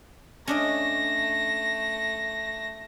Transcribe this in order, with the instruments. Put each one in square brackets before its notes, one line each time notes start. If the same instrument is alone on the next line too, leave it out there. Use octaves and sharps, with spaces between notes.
[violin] A3 A#6 [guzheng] C#4 D4 D#5